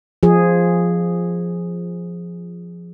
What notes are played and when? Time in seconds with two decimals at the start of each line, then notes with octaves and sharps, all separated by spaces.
0.23 F3 G#4